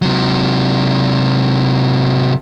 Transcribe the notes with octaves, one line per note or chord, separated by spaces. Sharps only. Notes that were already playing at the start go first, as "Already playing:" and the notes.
C3 F#3